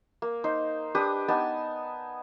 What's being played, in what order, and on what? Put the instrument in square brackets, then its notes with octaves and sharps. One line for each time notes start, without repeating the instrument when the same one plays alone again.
[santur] A#3
D#4 C5
D4 G4 B4 D#6
B3 D#4 G#5 A5